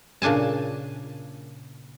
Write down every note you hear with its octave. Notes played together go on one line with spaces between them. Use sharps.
A#2 C#3 D4 G#5 A5